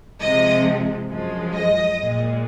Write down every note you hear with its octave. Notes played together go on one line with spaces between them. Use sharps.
C3 F3 G#3 D#5
F#2 F3 G#3
D#5
A#2 G#3